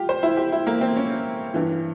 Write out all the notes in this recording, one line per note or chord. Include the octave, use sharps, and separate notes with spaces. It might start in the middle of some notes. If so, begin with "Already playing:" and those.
Already playing: F4 G4
C5
E4
G4
E4
A#3
C4
C#4
G2 E3